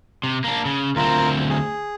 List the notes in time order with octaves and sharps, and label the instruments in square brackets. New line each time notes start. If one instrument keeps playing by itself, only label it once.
[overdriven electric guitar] C3
A#3 D4
C#3
[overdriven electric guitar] D2 C4 [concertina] F4 A#4
[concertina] G#4